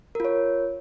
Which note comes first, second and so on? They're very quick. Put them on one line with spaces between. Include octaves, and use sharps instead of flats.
A#4 F4 C#5